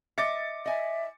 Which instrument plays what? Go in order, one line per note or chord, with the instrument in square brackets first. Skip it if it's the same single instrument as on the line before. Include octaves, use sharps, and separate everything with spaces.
[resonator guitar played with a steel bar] D#5 E5 [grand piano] D6 A6 C#7
[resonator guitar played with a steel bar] D#5 G#5 [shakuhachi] E5